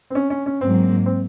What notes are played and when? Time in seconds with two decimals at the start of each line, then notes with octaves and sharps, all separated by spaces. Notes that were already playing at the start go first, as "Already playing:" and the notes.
0.10 C4
0.15 C#4
0.30 C#4
0.46 C#4
0.61 G#2 F#3 A#3 C4
1.06 C4